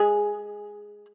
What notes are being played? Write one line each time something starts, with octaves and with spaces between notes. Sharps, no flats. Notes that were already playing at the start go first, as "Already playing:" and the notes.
Already playing: G#3 G#4